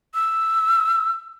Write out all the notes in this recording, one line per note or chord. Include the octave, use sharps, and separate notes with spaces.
E6